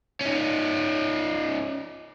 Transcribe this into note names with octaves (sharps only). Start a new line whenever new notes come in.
C#4 D#4